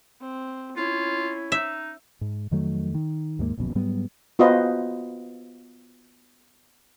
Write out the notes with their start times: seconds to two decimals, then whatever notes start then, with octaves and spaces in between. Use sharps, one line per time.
0.21 C4
0.77 C#4 E4 F4
1.52 D#4 E5
2.21 G#2
2.51 F2 D#3 F#3 A3
2.95 D#3
3.39 D#2 G#2 A3 A#3
3.58 D1 A#1 F#2 B2
3.75 G#2 F#3 G3 B3
4.39 B3 F4 F#4 B4 C5 D#5